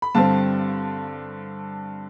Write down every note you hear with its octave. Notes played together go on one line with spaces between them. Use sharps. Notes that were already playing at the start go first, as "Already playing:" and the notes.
B5
G2 D3 G3 C4 F5 A5